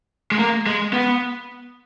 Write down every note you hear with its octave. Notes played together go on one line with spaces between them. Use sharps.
G#3
A#3
G#3
B3